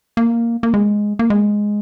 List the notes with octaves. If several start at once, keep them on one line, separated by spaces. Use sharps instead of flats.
A#3
A#3
G#3
A#3
G#3